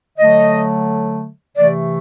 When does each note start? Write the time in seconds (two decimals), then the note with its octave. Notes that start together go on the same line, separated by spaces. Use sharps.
0.18 D3 F#3 A3 D#5
1.56 C3 E3 A3 D5